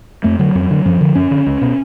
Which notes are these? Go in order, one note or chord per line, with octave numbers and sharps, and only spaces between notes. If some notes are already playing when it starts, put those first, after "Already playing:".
F2 A3
D3 F#3
F2
D3
F#2 F3
D3
F#2 C#4
D3
C#2
B2